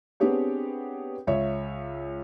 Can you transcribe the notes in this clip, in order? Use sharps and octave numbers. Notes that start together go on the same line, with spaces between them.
B3 C4 D4 G4 G#4 C#5
C#2 C#5 E5